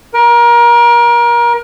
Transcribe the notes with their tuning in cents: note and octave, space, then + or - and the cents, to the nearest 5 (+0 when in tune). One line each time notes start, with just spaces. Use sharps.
A#4 +30